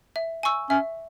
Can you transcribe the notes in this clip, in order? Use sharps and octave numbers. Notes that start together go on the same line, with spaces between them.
E5
G#5 C#6 E6
C#4 E5